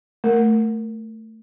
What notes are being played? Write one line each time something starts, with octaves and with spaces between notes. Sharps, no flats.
A3 A#4